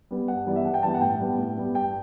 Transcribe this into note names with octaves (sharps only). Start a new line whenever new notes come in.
G3 B3
G2 F#5
E3 G3 B3 D5
E5
G2 F#5
G5
E3 G3 B3 A5
F#5
A2 G5
G3 B3
A2
G3 B3
G2 G5